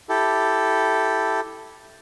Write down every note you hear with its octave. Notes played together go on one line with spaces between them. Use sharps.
E4 G4 A4